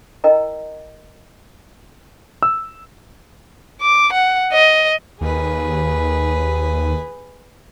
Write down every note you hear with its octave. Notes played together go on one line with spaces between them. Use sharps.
E4 A#4 D#5 G5 A#5
E6
D6
F#5
D#5
D#2 G#4 B4